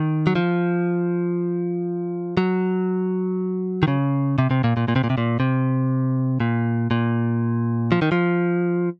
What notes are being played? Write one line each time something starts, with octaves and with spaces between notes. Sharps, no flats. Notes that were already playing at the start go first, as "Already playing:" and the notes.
Already playing: D#3
F#3
F3
F#3
D#3
C#3
C3
C3
A#2
A#2
A#2
C3
A#2
C3
A#2
C3
A#2
A#2
F3
D#3
F3